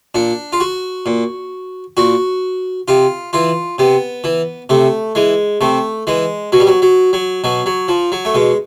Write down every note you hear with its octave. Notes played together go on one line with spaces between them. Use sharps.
A#2 D4
F4
F#4
A#2
A#2 F#4
C3 F4
E3 F4
C3 B3
E3
C3 A3
E3 G#3
C3 A3
E3 G#3
B2 F#3
G3
F#3
F#3
F#3
B2 F#3
F#3
F3
F#3
A3
B2 G#3